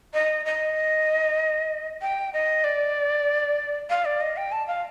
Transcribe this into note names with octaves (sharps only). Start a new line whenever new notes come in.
D#5
D#5
G5
D#5
D5
F5
D5
D#5
G5
A5
F5